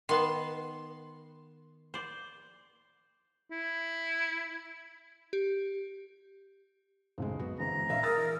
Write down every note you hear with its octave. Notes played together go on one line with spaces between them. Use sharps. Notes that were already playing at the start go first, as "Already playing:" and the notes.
D#3 B3 A5 C6
C5 D5
E4
G4
B1 F#2 A2 C#3 G#3 C4
F#2 B3 F#4
G1 E3 G#3 C4 A#5
A#1 D5 E5 F5
G#4 A#4 D#6 E6 A6
E3